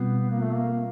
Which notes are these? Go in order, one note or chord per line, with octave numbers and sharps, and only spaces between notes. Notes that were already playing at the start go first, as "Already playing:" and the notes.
Already playing: B2 G3 B3 C4 F4
A#3
A3
A#3